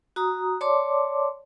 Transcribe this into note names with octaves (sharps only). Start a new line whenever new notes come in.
F#4 A#5 D#6
C#5 D5 A5 C6 D6